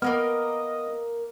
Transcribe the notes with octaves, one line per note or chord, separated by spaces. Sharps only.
A#3 B3 A#4 D#5 F6